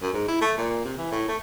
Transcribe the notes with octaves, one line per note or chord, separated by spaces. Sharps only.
F#2
G#2
E4
A3
A#2
C3
E3
A2
A3